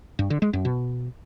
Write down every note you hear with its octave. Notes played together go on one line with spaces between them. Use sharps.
G2
D3
G#3
F#2
B2